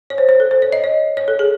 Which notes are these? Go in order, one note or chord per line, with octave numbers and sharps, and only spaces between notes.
C#5
C5
C5
A4
C5
C#5
D#5
C#5
C#5
A4
G#4